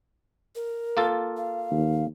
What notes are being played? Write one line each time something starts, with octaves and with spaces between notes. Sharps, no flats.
A#4
A#3 F4 A4
F5
D#2